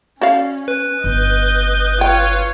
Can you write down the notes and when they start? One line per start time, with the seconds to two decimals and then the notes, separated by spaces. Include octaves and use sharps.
0.21 C#4 F#4 D5 F5
0.68 B4
1.04 G1 D#5 G6
2.01 F4 C#5 G5